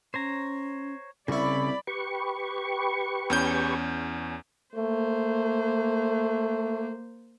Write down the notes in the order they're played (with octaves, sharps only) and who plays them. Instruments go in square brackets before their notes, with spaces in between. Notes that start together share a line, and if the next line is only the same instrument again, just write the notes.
[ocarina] C#4 [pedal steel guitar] C5 C#5 A#5
[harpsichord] C2 E4 [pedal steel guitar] C#3 C#6 [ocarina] C4 [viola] D5 B5
[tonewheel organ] G4 B4 C#6
[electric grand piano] E2 C#4 G6
[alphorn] A3 [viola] A#3 C5